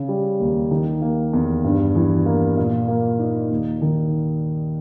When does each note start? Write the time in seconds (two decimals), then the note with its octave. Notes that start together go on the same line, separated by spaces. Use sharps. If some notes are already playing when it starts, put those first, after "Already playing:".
Already playing: C#3
0.08 G3
0.40 D#2
0.71 D#3
1.02 A#3
1.33 E2
1.64 G2
1.95 E3
2.26 A#3
2.57 A#2
2.88 A#3
3.19 D#4
3.51 D#2
3.82 D#3